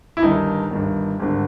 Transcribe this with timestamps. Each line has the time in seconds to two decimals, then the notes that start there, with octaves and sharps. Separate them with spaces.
0.17 E4
0.22 G1 G2 D#3 D#4
0.71 G1 G2 D#3
1.20 G#1 G2 D3